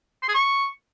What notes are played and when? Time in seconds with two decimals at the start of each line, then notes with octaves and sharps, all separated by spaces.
0.23 C6
0.29 G#4
0.34 C#6